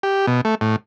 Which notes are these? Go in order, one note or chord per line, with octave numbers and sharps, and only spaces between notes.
G4
B2
A3
A2